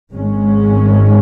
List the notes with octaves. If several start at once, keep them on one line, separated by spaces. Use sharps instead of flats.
G#1 G#2 G#3 C#4